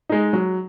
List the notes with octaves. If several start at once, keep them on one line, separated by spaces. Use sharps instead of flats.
G#3 D#4
F#3